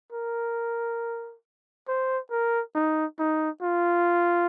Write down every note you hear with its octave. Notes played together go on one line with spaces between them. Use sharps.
A#4
C5
A#4
D#4
D#4
F4